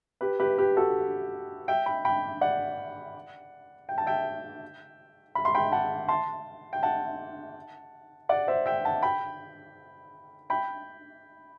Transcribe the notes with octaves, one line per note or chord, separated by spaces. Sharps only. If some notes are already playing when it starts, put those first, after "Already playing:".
G4 B4
G4 B4
G4 B4
F#4 A4
E5 G5
G5 B5
G5 B5
D5 F#5
G5
A5
E5 G5
B5
C6
G5 B5
F#5 A5
A5 C6
G5
F#5 A5
D5 F#5
C5 E5
E5 G5
F#5 A5
G5 B5
G5 B5